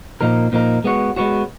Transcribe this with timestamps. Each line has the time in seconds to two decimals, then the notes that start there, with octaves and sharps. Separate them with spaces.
0.21 A#2 F3 A#3 D#4 A#4
0.52 A#2 F3 A#3 D#4 A#4
0.84 G#3 B3 F#4 C#5
1.16 G#3 B3 F#4 C#5